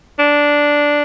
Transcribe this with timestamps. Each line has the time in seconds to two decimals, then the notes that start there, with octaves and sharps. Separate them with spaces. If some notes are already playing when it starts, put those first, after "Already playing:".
0.19 D4